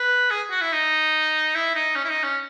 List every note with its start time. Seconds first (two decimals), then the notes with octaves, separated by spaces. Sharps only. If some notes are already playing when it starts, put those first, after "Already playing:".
Already playing: B4
0.30 G#4
0.51 F#4
0.61 E4
0.72 D#4
1.54 E4
1.75 D#4
1.96 C#4
2.05 E4
2.09 D#4
2.23 C#4